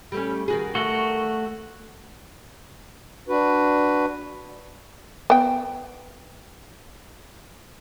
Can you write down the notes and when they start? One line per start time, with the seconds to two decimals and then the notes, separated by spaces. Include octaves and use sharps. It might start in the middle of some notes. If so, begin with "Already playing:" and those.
0.12 G3 A3 C#4
0.48 D#3 F#4 G#4
0.75 D#3 A3 F#4
3.29 D4 F#4 B4
5.30 B3 G5